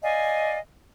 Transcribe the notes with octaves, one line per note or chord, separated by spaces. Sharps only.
D5 D#5 F5 G#5